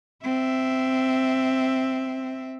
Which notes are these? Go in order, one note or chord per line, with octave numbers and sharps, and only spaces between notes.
C4 E5